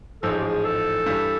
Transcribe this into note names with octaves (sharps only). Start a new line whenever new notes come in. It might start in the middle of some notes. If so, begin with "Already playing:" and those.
A1 G#2 F3 A4
G#4
G4
G#4
A4
G2 E3 G3